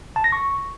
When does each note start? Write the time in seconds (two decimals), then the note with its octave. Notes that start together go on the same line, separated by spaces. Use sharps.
0.16 A5
0.24 A#6
0.32 C#6